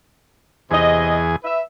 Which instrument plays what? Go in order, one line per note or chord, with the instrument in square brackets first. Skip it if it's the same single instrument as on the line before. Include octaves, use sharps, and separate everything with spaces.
[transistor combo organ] E2 G#4 [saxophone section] C3 D#5
[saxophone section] B4 E5